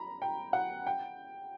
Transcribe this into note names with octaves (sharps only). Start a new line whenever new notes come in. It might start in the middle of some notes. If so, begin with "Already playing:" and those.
Already playing: A#5 B5
G5
F#5
G5